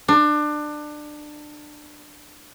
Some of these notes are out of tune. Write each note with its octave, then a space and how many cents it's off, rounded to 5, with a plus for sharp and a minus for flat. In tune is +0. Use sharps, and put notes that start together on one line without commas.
D4 +25